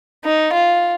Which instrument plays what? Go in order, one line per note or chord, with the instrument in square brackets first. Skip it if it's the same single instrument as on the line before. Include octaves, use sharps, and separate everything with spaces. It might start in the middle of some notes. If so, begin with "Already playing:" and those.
[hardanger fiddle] D#4
F4